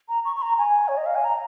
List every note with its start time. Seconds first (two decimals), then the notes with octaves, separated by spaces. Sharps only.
0.09 A#5
0.25 C#6
0.36 C#6
0.42 A#5
0.58 G#5
0.88 C#5
0.97 D#5
1.06 F5
1.15 G#5
1.24 A#5